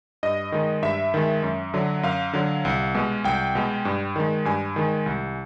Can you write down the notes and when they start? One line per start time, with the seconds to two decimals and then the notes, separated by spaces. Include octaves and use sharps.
0.23 G2 D#5
0.52 D#3 G#3
0.82 G2 E5
1.14 D#3 G#3
1.43 F#2
1.74 D3 F#3
2.03 F#2 F5
2.33 D3 F#3
2.65 C2
2.95 B2 G#3
3.24 C2 G5
3.55 B2 G#3
3.85 G2
4.16 D#3 G#3
4.45 G2 G#5
4.76 D#3 G#3
5.06 C2